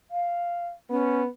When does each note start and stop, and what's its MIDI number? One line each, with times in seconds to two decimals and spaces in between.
0.11 0.66 77
0.90 1.28 59
0.90 1.20 61